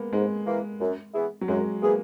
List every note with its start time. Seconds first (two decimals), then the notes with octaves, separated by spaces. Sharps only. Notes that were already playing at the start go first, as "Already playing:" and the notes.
Already playing: G#3 A#3 B3
0.12 G#2 G#3
0.47 E3 A#3
0.81 F#2
1.14 E3 B3 E4 G#4
1.41 F#3
1.48 F#2 G#3
1.82 E3 A#3 B3 E4 G#4